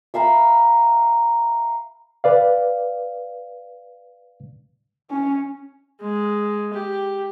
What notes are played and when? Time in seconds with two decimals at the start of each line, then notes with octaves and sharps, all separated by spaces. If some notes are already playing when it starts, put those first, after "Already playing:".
0.14 E5 F5 A#5 B5
2.24 B4 D5 F5
5.11 C#4
6.01 G#3
6.73 G4